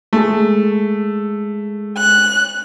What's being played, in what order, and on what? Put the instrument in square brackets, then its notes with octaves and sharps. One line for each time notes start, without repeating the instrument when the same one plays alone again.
[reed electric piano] G#3 G#4 [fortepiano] A3
[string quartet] F#6